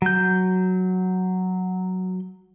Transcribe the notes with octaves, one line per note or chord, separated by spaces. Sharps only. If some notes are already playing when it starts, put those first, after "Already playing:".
F#3 G6